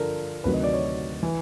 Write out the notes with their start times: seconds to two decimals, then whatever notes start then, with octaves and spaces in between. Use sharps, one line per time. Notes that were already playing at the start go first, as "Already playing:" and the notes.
Already playing: G2 D3 F3 A4 A#4
0.44 D2 C3 D#3 F#3 B4
0.54 D#5
0.64 D5
0.74 C#5
1.23 E3